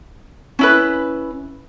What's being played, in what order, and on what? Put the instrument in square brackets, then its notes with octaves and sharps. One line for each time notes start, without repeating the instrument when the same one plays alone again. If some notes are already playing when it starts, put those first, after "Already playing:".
[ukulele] C#4 E4 B4